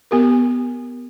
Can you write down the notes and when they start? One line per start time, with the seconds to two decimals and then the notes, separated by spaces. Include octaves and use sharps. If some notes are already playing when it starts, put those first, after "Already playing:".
0.11 B3 G4 A#4